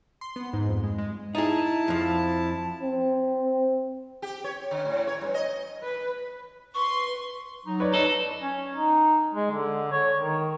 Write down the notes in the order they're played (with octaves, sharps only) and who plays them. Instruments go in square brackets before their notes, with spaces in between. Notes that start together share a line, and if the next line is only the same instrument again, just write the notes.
[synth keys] C6
B3
G#2
F2
G#3
G#3
[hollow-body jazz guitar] D#4 G#4 [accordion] E4 A5
[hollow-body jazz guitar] F2 F3
[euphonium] C4
[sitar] G4
C#5
D3
A2
C#5
G2
D#5
[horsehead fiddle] B4
[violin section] B4 C6 [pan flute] C#6
[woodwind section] F#3 D#4
[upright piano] B4 C#5 D5
[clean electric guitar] D#4 A4
[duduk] C#4
D#4
G#3
D3
C#5
D#3